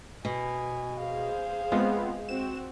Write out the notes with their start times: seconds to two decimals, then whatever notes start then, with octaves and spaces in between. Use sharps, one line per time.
0.25 B2 G#5
1.01 G#4 C5 F5
1.72 G#3 B3 C4 F4
2.29 C4 F#4 E7